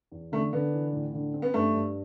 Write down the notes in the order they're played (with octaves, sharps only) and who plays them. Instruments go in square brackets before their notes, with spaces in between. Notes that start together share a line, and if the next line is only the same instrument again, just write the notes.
[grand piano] E2
[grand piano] D3 [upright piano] A3
[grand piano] D3 [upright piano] B3
[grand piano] E3
A2
D3
C4
[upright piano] B3
[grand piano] G2 [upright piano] A3
[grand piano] G2